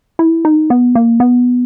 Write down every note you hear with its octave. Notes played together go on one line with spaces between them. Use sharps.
E4
D#4
B3
A#3
B3